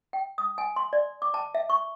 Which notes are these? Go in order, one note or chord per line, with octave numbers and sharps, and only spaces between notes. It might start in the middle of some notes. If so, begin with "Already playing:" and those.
G5
D#6
G#5
C6
D5
D6
A5
E5
C#6